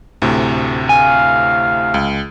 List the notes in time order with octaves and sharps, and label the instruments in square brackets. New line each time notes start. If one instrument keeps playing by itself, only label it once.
[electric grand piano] D2 A2 C3
[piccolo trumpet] F5 [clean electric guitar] G#5
[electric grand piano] C#2